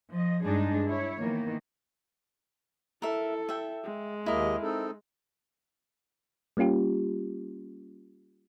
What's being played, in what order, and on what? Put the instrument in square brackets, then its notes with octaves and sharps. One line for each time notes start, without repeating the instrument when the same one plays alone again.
[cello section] F3 D#5
G2 G#3 D4 D#4 G#4
E4 C#5
D#3 E3 A#3 B3
[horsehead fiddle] E4 A4 [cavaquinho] A#4 E5
[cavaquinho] E5 G5
[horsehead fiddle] G#3
[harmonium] D#2 A#3 D#5 [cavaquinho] E4 A#4
[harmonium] C4 D#4 A4
[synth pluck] G3 A#3 C#4 F4 G4